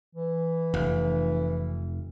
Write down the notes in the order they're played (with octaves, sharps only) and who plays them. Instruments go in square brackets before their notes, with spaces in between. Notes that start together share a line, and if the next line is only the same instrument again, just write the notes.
[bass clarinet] E3
[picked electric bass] F1